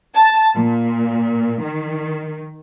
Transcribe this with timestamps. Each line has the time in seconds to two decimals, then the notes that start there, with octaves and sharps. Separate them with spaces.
0.14 A5
0.56 A#2
1.63 D#3